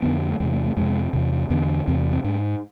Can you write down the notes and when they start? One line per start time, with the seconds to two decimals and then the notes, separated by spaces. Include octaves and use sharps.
0.02 F2 D3 B3
0.29 A3
0.40 E2 G#3
0.43 C3
0.52 A3
0.65 A3
0.77 F2 C3 G#3
1.13 E2 C3
1.50 E2 D3 B3
1.88 E2 C3 C4
2.13 C4
2.24 G#2 D4